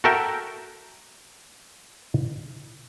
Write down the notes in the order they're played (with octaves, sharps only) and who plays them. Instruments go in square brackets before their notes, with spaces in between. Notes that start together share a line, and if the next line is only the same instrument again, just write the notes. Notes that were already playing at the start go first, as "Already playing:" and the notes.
[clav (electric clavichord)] F#4 A4 A#4 E5 G5